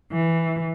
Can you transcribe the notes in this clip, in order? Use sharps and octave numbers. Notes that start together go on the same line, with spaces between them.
E3